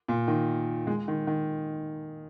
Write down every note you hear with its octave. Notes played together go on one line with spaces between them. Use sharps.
A#2
D#3
G#3
D#3
D#3